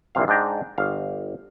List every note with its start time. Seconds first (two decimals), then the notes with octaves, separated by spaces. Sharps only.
0.15 A#1 E2 C3 F5
0.28 G#2 D4 G5 A#5
0.78 G1 F5